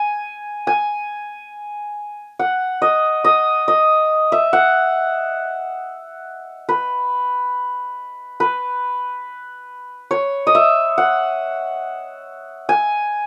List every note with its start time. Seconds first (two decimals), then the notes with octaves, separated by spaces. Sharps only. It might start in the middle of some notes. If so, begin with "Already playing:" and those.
Already playing: G#5
0.67 G#5
2.39 F#5
2.82 D#5
3.24 D#5
3.68 D#5
4.32 E5
4.53 F#5
6.69 B4
8.40 B4
10.11 C#5
10.47 D#5
10.55 E5
10.98 F#5
12.69 G#5